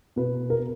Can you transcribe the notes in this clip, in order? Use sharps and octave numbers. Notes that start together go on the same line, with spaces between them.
B2 B4
A#4